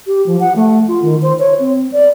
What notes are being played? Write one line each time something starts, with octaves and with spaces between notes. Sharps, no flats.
G4
F3
F#5
A3
F4
D#3
C5
C#5
C4
D5